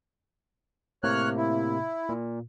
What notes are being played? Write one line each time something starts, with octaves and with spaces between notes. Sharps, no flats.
A2 C3 A#3 C#5 F6 F#6
E4
A#2